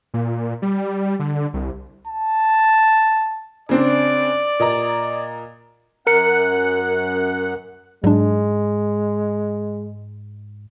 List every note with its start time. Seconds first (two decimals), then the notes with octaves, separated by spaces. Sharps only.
0.14 A#2
0.62 G3
1.20 D3
1.54 C2
2.08 A5
3.69 C#3 C4 D4 D5
4.59 A#2 D#5 A#5
6.07 F#2 A#4 F#5 F#6 C#7
8.04 G#2 F#3 G#3 D4